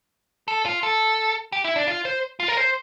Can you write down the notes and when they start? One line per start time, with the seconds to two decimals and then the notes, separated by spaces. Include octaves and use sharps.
0.48 A4
0.66 F4
0.83 A4
1.52 G4
1.64 E4
1.76 D4
1.88 F4
2.05 C5
2.40 F4
2.48 A#4
2.57 C5